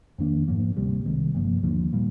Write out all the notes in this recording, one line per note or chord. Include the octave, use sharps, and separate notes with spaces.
F2 D#3 A#3 D4
G#2 F3 A#3
D2 C3 G3
C2 C3 D#3 G#3
G1 G2 F3 A#3
D#2 D3 F3 A#3
A#2 G3 A#3